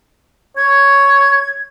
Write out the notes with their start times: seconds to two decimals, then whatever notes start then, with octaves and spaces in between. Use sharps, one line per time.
0.57 C#5 G#6